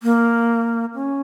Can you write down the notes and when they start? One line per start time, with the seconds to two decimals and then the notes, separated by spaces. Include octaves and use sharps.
0.03 A#3
0.95 C#4